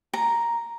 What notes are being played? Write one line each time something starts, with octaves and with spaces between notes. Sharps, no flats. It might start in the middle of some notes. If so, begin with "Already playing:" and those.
A#5